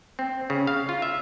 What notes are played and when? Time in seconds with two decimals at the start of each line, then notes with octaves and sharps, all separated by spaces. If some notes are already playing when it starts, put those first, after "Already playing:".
0.19 C4
0.50 C#3
0.67 F5
0.89 F4
1.02 E5